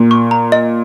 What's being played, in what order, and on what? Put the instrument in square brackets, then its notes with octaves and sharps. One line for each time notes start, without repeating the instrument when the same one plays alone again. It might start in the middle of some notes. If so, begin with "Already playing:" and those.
Already playing: [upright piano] A#2
[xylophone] C#6
A#5
D#5